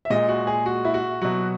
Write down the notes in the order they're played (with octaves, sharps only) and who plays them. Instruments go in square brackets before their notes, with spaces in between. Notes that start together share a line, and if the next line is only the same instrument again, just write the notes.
[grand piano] E5
A#2 G#3 D#5
F#4
G#4
F#4
E4
F#4
B2 F#3 F#4